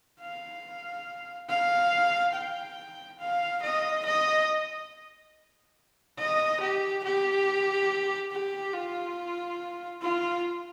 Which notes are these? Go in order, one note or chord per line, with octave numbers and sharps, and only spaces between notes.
F5
F5
G5
F5
D#5
D#5
D#5
G4
G4
G4
F4
F4